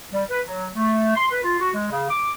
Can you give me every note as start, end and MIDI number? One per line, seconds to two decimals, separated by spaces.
0.12 0.23 55
0.30 0.40 71
0.46 0.69 54
0.76 1.13 57
1.15 1.26 84
1.30 1.43 71
1.43 1.56 65
1.60 1.70 66
1.73 1.86 56
1.90 2.08 49
2.09 2.33 86